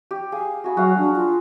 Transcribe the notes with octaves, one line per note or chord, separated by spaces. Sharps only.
G4
G#4 F5
F#4 G#4 B5
F#3 F#4 F5
D4
F4